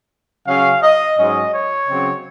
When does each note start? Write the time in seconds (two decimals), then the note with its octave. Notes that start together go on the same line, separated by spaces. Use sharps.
0.47 C#3 F#3 C#4 F5
0.83 D#5
1.17 G#2 F#3 C#4 D#5
1.52 C#5
1.87 C#3 F#3 C4